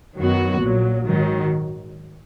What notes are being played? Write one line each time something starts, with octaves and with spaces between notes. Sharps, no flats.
F#2 D#3 F#3 B3 F#4
A#1 A#2 F#3
G#2 D#3 F#3